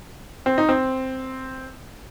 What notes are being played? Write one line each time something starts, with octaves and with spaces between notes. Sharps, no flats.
C4
D#4
C4